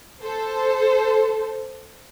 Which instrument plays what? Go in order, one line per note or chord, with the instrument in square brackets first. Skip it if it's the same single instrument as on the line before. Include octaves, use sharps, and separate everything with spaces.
[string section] A4 C5